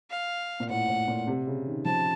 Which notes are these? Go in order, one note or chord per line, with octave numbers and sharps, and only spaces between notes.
F5
A#2
A2 F#5
A2
A#2
C3
C#3
D#3
F3 A5